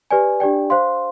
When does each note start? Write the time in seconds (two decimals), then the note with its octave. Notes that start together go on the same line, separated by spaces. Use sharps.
0.11 G4 B4 D5 G#5
0.40 D4 G4 D5 G5
0.70 C5 F5 C6